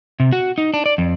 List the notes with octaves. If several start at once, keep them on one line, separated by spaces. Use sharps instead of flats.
C3
F#4
D#4
D4
D5
F2